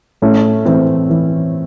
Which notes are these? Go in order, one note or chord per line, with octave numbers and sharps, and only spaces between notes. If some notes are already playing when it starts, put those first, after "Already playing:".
A2 A3 C#4
E3 C4
E3